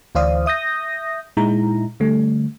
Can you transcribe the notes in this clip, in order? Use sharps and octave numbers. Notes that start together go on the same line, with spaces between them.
D2 E3 C5 D5 F5 D#6
E5 D#6 G6 A#6
A#2 G#3 D#4 E4 A#5
D3 G3 A3